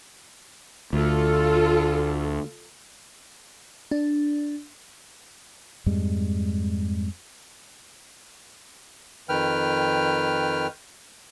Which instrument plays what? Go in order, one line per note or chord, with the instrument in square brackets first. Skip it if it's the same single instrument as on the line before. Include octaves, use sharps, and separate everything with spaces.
[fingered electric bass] D2 [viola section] F4 A4
[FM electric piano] D4
[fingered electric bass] F2 G#2 G3 G#3
[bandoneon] F2 D#3 B4 G5 F6